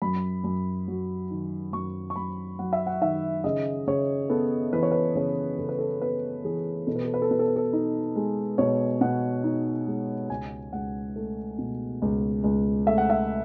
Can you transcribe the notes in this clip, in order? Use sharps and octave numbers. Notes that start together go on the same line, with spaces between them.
F#2 B5
F#2
F#3
D#3
F#2 C#6
C#6
F#2 B5
F#3 F#5
E5
F#5
D#3 E5
C#3 D#5
C#3 C#5
B3 A4
E3 B4
C#5
B4
C#3 C#5
C#3 A4
B4
A4
B3 B4
E3 G#4
B2 A4
B4
A4
B4
A4
B2 B4
A4
B4
A4
D#4
G#3
B2 C#5
B2 F#5
D#4
G#3
C#2 G#5
C#2 F#5
A3
B2
C#2
C#2
A3 E5
F#5
E5